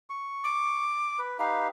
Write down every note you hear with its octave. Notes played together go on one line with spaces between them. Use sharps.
C#6
D6
B4
D#4 G4 B4 F5